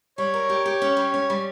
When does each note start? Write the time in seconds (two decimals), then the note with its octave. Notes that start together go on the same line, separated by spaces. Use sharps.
0.18 G3 C#5
0.34 A#4
0.50 G4
0.66 G4
0.82 C#4
0.97 G3
1.14 C#4
1.30 G3